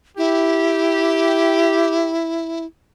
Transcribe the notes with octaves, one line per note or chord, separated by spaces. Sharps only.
E4 G4